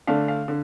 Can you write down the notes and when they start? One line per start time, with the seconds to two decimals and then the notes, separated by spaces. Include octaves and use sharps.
0.07 D3 A3 D4 F5
0.28 F5
0.48 D3